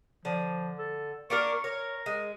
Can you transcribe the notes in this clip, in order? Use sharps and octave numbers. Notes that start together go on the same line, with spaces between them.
D3 F3
A4
A#3 D4 A#4 C#6
A#4 C#5
G#3